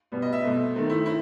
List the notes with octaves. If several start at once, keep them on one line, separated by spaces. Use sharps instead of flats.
B2 G3 B3
D#5
E5
B2 A3 C4
D#3 A3 C4
E4
C4 E4